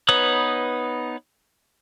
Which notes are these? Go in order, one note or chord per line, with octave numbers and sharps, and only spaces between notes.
B3 D#4 B4 C#5 D#6